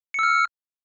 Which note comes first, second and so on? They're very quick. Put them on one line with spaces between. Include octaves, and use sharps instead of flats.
C#7 E6 F6